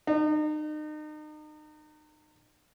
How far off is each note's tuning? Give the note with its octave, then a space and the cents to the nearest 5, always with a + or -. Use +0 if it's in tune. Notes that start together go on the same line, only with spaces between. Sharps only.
D#4 -35